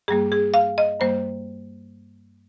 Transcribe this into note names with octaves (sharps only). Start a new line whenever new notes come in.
G2 G3 A#3 G#4
G#4
F5
D#5
G2 G3 A#3 C5